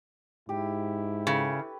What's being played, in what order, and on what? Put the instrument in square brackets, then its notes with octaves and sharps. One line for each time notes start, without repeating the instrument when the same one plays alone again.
[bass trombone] G#2 [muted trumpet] E4 [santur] G4
[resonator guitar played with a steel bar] C#3 [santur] A4 B4